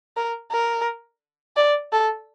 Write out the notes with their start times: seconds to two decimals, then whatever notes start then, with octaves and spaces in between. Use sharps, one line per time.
0.17 A#4
0.52 A#4
1.57 D5
1.92 A4